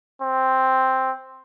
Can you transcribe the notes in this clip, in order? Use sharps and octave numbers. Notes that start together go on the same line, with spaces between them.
C4